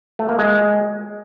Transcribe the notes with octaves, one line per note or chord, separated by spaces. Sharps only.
A3
A#3
G#3